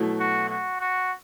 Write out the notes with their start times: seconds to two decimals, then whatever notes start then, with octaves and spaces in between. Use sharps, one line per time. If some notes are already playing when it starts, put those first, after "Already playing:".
Already playing: B2 F#3 A3 E4
0.19 F#4
0.49 F#4
0.80 F#4